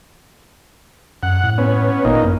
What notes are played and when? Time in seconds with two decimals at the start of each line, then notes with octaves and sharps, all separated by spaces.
1.23 F#2 F#5
1.43 A2
1.58 B3 C#4
2.05 G#1 A#2 D#4
2.23 F#2